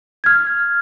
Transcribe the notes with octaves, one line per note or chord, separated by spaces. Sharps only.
F6 G#6